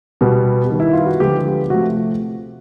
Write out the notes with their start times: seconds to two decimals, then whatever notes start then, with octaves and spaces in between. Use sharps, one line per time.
0.21 B2 G3 B3
0.70 D#3 G3 B3
0.80 E4
0.93 F4
1.06 F#4
1.20 D3 F3 G#3 B3 G4
1.70 C3 F3 A3 F#4